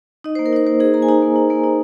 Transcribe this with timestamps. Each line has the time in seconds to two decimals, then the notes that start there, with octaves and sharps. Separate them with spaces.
0.24 D#4 D#5
0.35 C5
0.39 A#3
0.46 A#4
0.53 D#4 C5
0.67 A#3 C5
0.80 D#4 G#4
0.94 A#3 A#5
1.02 G#5
1.09 D#4 A#5
1.22 A#3
1.36 D#4
1.50 A#3
1.64 D#4